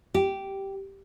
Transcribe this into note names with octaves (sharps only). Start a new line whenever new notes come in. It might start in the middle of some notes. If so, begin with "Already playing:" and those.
G4